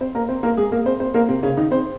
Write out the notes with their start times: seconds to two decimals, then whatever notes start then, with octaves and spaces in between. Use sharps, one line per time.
0.01 C4 C5
0.15 A#3 A#4
0.29 C4 C5
0.43 A#3 A#4
0.57 G#3 G#4
0.72 A#3 A#4
0.86 C4 C5
1.00 C4 C5
1.14 A#3 A#4
1.29 C3 C4
1.43 C#3 C#4
1.57 D#3 D#4
1.71 C4 C5